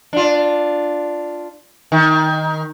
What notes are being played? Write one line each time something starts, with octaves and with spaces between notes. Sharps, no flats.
D4 F4
D#3